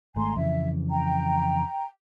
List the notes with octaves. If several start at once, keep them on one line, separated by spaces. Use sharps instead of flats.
G#1 G#2 A3 G#5 A#5 C6
F2 C#3 E3 E5
G5 A#5